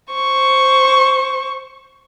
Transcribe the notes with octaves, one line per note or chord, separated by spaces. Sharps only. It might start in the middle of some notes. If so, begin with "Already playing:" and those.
C5 C#6